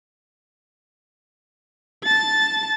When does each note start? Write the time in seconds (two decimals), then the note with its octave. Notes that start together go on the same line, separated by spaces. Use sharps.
2.04 A5 A6